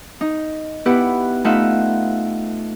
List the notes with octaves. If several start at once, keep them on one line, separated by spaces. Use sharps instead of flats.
D#4
B3 E4 G4 B4 F#5
A3 D#4 F4 E5 F#5